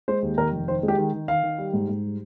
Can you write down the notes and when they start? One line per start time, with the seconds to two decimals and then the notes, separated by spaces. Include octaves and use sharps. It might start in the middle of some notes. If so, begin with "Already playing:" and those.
0.08 G#3 C5
0.22 D#2
0.37 D#3 A#4
0.52 F1
0.68 D#3 C5
0.83 G#3
0.88 G4
0.98 D#3
1.13 D#3
1.28 D#3 F5
1.43 D#3
1.58 G3
1.73 G#2
1.89 G#2
2.04 G3